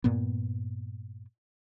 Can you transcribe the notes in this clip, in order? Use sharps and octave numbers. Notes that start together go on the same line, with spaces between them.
G2 A#2 A#3 B3